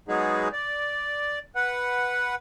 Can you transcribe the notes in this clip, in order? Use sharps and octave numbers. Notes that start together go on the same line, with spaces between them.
F#3 G#3 B3 D#4 G#4
D5
B4 F#5